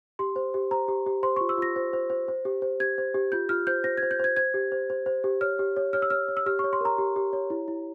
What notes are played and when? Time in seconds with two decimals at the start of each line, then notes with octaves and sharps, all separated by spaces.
0.19 G4 C6
0.36 C5
0.54 G4
0.71 C5 A#5
0.88 G4
1.06 G4
1.23 C5 C6
1.36 F4 C#6
1.49 E6
1.57 F4 A#6
1.76 C5
1.93 C5
2.10 C5
2.28 C5
2.45 G4
2.62 C5
2.80 G4 G#6
2.98 C5
3.14 G4
3.32 F4 G6
3.49 F4 F6
3.67 C5 G6
3.84 C5 A#6
3.97 G#6
4.03 C5
4.11 G6
4.19 C5 G#6
4.37 C5 G#6
4.54 G4
4.72 C5
4.90 C5
5.06 C5
5.24 G4
5.41 C#5 F6
5.59 G4
5.76 C#5
5.93 C#5 F6
6.02 E6
6.10 C#5 F6
6.28 C#5
6.37 E6
6.46 G4 F6
6.59 C#5 C#6
6.73 C6
6.81 A#4 A#5
6.98 G4
7.16 G4
7.33 C#5
7.50 E4
7.68 E4